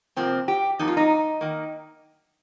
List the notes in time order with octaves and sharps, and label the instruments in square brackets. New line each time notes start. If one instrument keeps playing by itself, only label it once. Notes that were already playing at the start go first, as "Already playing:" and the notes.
[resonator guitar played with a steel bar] C3 F3 A#3 C4
G4
F2 F3 A#3 D#4
F4
D#4
D#3 A#3